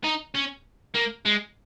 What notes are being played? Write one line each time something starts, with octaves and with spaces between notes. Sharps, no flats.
D#4
C#4
A#3
G#3